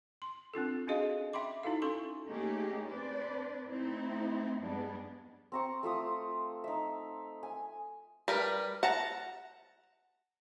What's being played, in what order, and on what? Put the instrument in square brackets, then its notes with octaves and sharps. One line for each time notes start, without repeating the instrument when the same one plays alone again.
[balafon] C6
C4 D4 F4 A4
C#4 D4 F#4 G#4 D#5 F5
E5 G5 B5 C6 D6
D#4 E4 F#4 A4 F5
C#4 A4 C6 C#6
[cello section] A3 A#3 C#4 D#4 G4 G#4
C4 D4 B4 C5 D5
A3 C4 D#4 E4
G2 G3 G#3 B3 D4
[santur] C4 A#5 C#6
A3 F4 E5 D#6
D#4 E5
G#5
[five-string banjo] G3 A#4 B4
F#5 A5 A#5